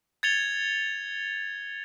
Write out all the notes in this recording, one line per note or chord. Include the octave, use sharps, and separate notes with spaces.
G#6 A6 C#7 F7 G7